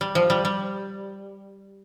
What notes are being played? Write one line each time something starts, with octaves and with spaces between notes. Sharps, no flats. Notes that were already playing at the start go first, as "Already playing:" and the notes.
G3
F3
G3
G3